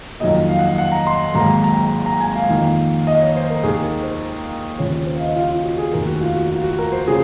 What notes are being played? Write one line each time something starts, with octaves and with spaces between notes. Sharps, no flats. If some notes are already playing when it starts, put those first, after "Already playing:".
F2 D#3 F#3 A#3 D#5
F5
F#5
F5
F#5
A#5
C6
G#1 G#2 F#3 A#3 A#5
A#5
A#5
G#5
F5
F2 D#3 A#3
D#5
C#5
C5
A#4
D#2 D#3 A#3 G#4
G#4
A#4
C5
D#2 C#3 F3 C#5
C#5
C5
F5
D#5
F4
F4
F#4
G#4
F1 D#2 D#3 A#4
F#4
F4
F#4
F4
F#4
A#4
C5
C#3 F3 A#3 G#4